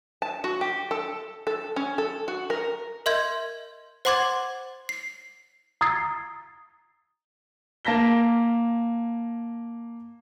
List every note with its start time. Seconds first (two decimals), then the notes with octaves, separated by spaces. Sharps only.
0.22 A5
0.44 F#4
0.61 G4
0.91 A4
1.47 A4
1.76 C#4
1.98 A4
2.28 F#4
2.50 A#4
3.06 A#4 D#5 E5 C6 G6 G#6
4.05 C5 F#5 C6 D6 G#6 A6
4.89 C7
5.81 A#5 D#6 E6 G#6 A6 C7
7.85 A#3 A5 A#6 B6 G7